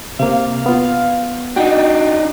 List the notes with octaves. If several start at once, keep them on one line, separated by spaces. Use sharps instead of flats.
C3 A#3 F5
B3 F4
D4 D#4 F#4 G5